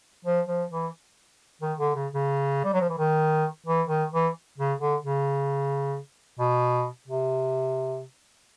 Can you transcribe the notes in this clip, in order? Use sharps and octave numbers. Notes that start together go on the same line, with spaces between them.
F3
F3
E3
D#3
D3
C#3
C#3
G3
F#3
F3
E3
D#3
E3
D#3
E3
C#3
D3
C#3
B2
C3